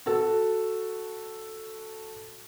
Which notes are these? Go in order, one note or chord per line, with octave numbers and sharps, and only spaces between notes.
F#4 A4